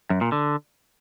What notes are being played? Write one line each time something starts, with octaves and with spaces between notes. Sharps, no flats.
F#2
A#2
D3